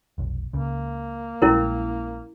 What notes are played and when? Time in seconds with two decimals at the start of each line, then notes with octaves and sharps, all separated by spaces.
0.18 F1 B1
0.53 C#2 C#3 A#3
1.42 A#1 G3 G#3 C#4 E4 A#4